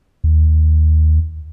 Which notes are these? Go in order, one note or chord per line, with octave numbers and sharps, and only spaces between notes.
D#2